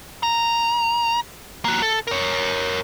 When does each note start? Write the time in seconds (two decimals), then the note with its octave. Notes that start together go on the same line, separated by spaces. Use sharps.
0.23 A#5
1.65 A#3 F#4
1.82 A4
2.07 A#4 C#5